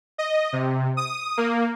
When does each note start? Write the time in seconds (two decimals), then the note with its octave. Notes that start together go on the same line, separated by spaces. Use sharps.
0.18 D#5
0.53 C3
0.97 D#6
1.38 A#3